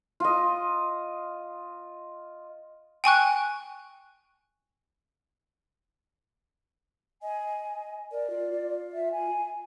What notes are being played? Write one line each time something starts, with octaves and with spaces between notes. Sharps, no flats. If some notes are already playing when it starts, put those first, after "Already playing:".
F4 D#5
G5 G#5 C#6 F#6
D#5 G#5
A#4 D5
F4
F4
E5
G#5